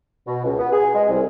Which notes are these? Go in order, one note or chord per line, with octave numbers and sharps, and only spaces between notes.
B2
C#2
B3
G#4
G#3
C2